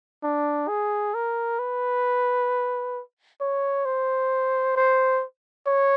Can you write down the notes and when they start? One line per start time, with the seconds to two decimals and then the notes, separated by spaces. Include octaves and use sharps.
0.23 D4
0.68 G#4
1.14 A#4
1.59 B4
3.41 C#5
3.86 C5
4.76 C5
5.67 C#5